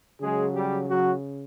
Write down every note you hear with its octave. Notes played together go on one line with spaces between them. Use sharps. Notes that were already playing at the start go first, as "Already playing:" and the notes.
C#3 F#3 G#3 G#4
G3 G4
F#3 F#4